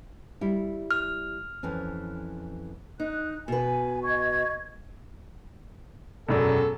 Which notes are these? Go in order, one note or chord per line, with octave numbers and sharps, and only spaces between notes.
G3 E4
F6
F2 E3 C#4
D#4 F#6
B2 B4 G#5
D#5 C#6 G#6
E1 F#2 A4 D5